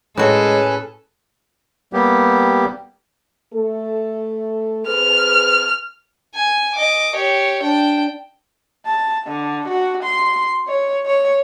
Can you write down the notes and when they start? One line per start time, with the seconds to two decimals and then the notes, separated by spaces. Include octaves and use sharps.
0.17 A2 G#3 C#4 F#4 G#4 A4 B4
1.93 G3 A#3 B3 G4
3.54 A3 A4
4.88 C4 G#4 B4 F6
6.35 G#5
6.75 D#5 D6
7.15 G4 C#5
7.62 D4 G5
8.86 A5
9.27 D3
9.68 F#4
10.03 C6
10.68 C#5
11.06 C#5